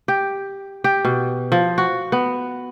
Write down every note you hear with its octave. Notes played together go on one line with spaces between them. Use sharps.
G4
G4
B2
F3
F#4
B3